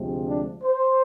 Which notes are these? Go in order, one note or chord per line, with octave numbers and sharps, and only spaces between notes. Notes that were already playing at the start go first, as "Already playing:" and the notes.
Already playing: D2 C3 F3 G#3
D4
C5